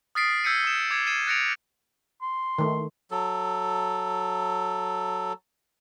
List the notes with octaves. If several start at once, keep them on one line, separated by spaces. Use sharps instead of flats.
D#6 F6 A6 B6 C7 D7
E6 G6 G#6 B6 C#7 D#7
D#6 E7
D6 G#6 C#7 E7
G#6 C7 D#7 E7
F#6 A6 A#6 C#7 D7 F7
C6
D#3 A3
F#3 A4